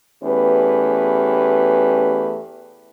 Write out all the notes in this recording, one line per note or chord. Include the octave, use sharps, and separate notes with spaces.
E2 A3 C#4 G4 B4